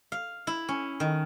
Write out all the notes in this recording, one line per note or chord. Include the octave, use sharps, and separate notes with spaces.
F5
E4
C#4
D#3